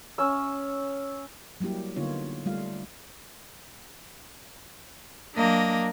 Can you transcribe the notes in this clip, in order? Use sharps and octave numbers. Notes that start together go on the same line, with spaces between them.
C#4 E6
F#3 G3 A#3 E4 G4
D3 A#3 B3 D#4 F4 C#5
G3 A3 F4 F5
F#3 A#3 D4 A#4 D#5